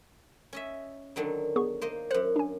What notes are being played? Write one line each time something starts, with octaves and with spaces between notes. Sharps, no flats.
C#4 D#5 E5
D3 D#3 F#3
B3 G#4 C#6
A#3 C5 D#5
F#2 C5 F#5
D4 G#5